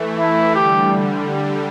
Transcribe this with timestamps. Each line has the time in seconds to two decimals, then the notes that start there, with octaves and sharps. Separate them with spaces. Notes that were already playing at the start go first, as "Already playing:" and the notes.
Already playing: E3 A3
0.18 E4
0.54 D3 G3 G4